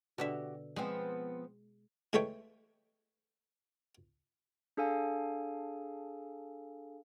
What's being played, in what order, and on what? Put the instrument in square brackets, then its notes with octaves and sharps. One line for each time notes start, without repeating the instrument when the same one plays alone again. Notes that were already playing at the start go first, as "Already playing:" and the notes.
[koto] B2 D3 E5 [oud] F#4 G4
[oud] F3 B3 C4 [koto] G#3
[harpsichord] E3 G#3 A3 A4 C#5 G5
[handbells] D4 G#4 A4 F5 G#5